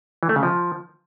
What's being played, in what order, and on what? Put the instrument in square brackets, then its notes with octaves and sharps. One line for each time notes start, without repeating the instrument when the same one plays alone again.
[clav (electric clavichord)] E3
A3
C#3
F3